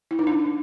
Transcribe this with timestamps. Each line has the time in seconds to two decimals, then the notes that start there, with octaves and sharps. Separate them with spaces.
0.11 E4
0.19 D#4
0.27 D4